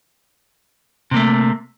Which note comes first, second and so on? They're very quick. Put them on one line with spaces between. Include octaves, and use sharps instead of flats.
C3 A#3 A3